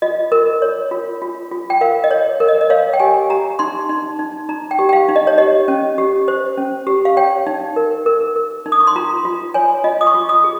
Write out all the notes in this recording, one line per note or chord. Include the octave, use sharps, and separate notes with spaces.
F4 D#5
A#4
C#5
F4
F4
F4
G5
A#4 F5
D#5
C#5
A#4
D#5
D#5
C#5 F5
G5
G4 G#5
G4 A#5
D#4 C6
D#4
D#4
D#4 A#5
G5
G4
G5
F5
D#4
D#5
C#5
G4 D#5
C#4
G4
C5
C#4
G4
F5
C#5 G5
D#4
A#4
A#4
A#4
D#4
D#6
C#6
C6
F4 A#5
F4
C#5 G#5
F4 D#5
D#6
C#6
F4
D#6
G#4